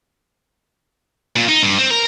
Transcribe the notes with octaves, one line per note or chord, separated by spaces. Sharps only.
A#2
D#4
G2
C4
A#4